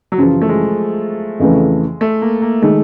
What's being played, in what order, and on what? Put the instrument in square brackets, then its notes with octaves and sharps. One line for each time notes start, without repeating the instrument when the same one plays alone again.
[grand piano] F#3
[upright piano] F#2 C#3 E3 [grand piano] F3
[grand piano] A3
G#3
[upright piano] F2 C#3 E3 A3
[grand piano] A3
A#3
A#3
[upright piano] D#3 G#3 [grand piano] A3